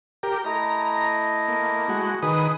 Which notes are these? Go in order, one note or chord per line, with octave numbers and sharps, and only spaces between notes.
G4 A#4
A3 E4 D#5 A#5
A#3
G#3 F#4
D#3 G#4 B4 D#6